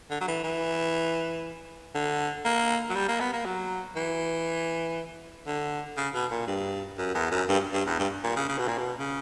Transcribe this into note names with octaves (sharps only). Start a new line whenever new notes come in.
D3
F#3
E3
E3
D3
A#3
F#3
G3
A#3
B3
A#3
F#3
E3
D3
C#3
B2
A#2
G2
F#2
E2
F#2
G2
G2
E2
G2
A#2
C#3
C#3
B2
A#2
B2
C#3